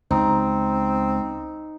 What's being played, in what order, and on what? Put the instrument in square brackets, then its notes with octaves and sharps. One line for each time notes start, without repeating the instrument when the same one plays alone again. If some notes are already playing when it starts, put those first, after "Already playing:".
[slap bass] C#2 [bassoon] C4 [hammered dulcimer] D#4